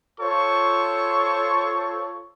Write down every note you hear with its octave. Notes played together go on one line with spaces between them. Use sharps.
F4 A4 C5 C#5 C#6